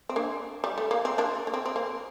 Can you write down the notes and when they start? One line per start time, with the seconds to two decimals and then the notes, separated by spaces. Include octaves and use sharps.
0.09 C4
0.16 A#3 D4
0.64 G3
0.78 A3
0.91 A#3
1.05 C4
1.18 A#3 D4
1.47 A#3
1.54 C4
1.66 C4
1.76 A#3